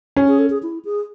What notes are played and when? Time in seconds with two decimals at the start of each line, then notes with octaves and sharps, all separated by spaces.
0.16 C#4
0.28 G#4
0.39 A4
0.50 G#4
0.63 E4
0.85 G#4